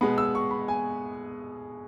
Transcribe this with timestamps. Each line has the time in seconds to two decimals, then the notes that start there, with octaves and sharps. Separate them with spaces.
0.01 B2 G#3 B3 B5
0.18 E6
0.35 C#6
0.51 B5
0.68 G#5